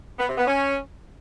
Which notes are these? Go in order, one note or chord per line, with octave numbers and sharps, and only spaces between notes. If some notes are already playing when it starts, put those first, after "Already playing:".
B3
C3
B3
C#4